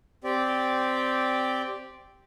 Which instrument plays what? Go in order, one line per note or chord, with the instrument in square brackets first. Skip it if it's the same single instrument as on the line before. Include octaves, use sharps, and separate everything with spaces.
[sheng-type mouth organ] C4 G4 D5